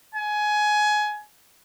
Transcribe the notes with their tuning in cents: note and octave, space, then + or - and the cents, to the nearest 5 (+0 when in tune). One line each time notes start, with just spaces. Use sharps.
G#5 +20